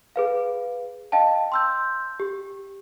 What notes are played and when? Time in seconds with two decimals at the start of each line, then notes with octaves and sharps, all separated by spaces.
0.16 G#4 B4 F5
1.12 D#5 F5 G5 A5
1.52 C6 E6 G6
2.20 G4